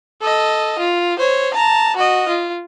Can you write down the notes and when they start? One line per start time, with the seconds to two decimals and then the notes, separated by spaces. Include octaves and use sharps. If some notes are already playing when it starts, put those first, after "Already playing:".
0.21 A4 D#5
0.79 F4
1.19 C5 C#5
1.54 A5 A#5
1.97 F#4 D#5
2.29 F4